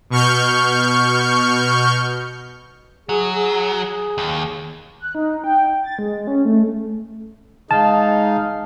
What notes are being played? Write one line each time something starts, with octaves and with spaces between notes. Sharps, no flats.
B2 C#6 F6 G6
F#3 G#4
G#4
D#2
F#6
D#4
G5
A6
G#3
C#4
A3
G#3 D#4 F5 A5